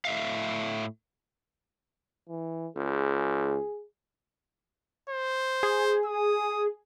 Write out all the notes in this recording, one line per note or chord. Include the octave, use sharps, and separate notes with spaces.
A2 E5 F5
E3
C#2 G#4
C5
G#4
D#6